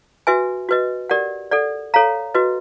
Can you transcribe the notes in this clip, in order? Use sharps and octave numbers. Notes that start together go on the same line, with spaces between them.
F#4 B4 E5 G#5
F#4 B4 D#5
G4 A#4 D5 F#5
A4 D5 F#5
A4 C#5 F5 A#5
F#4 B4 D#5